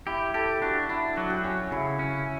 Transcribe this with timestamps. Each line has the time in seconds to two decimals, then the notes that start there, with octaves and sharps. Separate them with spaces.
0.07 E4 G4
0.34 G4 A4
0.62 D4 F#4
0.89 D4 E4
1.16 F#3 F#4
1.30 G4
1.44 C#4 F#4
1.71 C#3 E4
1.99 C#4